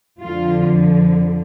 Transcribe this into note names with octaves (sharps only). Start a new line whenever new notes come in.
F2 D3 F3 F4